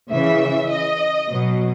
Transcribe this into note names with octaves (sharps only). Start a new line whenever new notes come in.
C#3 E3 E5
D#5
B2 F#3